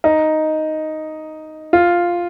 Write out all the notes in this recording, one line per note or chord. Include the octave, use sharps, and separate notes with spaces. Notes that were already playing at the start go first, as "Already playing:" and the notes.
D#4
F4